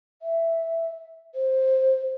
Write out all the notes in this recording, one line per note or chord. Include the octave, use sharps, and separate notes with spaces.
E5
C5